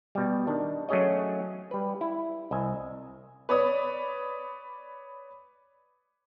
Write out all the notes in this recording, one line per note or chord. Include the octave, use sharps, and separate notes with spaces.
B2 G3
D#3 D4
F#3 A3 C#4 G#4 C#5 D#5
G3 B4
E4
C2 D#5 E5 G#5
B4 C#5 D5 D#6